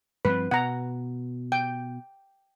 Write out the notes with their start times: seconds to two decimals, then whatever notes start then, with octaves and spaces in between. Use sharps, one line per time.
0.25 G2 F3 C4 B4
0.51 B2 F#5 A#5
1.52 G5